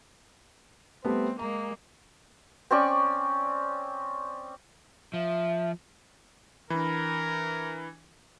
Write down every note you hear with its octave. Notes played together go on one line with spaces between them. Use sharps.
G3 A3 B3 C4
G#3 A#3 A#5
C4 C#4 D5 C#6
F3 E5
E3 D4 A#4 B5